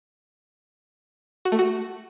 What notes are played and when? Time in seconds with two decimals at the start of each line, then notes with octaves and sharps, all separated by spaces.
1.45 F#4
1.52 A3
1.59 F#4